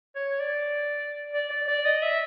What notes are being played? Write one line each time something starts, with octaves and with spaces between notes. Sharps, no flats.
C#5
D5
D5
D5
D5
D#5
E5